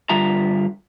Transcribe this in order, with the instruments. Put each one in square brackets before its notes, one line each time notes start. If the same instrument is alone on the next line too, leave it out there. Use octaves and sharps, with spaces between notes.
[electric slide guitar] G2 D3 G3 F4 E5 A#5